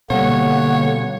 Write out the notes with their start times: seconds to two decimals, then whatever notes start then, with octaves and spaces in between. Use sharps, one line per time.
0.10 B2 D3 G3 A#3 C#5 F#5